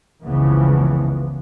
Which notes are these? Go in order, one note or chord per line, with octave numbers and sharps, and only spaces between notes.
F1 C#2 C#3 E3 F3 B3